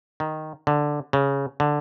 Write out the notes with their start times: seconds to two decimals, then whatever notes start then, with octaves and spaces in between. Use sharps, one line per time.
0.20 D#3
0.67 D3
1.13 C#3
1.60 D3